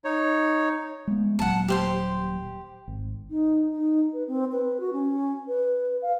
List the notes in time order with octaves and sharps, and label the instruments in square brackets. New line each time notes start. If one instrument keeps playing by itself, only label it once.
[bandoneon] D#4 C#5
[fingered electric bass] G#3 B3
[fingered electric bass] D#1 A#2 F#3 [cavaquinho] F#5 A5
[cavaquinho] G4 C5 C6
[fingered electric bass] G#1
[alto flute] D#4
D#4
B4
C4
B4
F#4
C#4
B4
F5